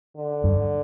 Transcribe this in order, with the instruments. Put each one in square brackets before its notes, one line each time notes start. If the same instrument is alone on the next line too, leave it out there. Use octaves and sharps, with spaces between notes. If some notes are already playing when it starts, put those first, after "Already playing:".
[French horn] D3
[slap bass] G2